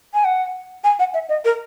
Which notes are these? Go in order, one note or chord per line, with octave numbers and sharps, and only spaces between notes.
G#5
F#5
G#5
F#5
E5
D#5
A#4